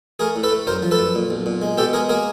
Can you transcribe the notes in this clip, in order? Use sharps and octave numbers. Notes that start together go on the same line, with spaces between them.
A3 G#4 A#4
A2
A4 B4
A3
F#2 A#4 C5
F3
A4 B4
F#2
A#2
B1
A#2
G#3
B2 G4 A4
G#3 G#4 A#4
A#3 G#4 A#4